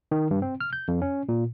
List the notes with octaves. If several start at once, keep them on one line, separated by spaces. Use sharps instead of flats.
D#3
G2
C4
F6
G6
F2
C#4
A#2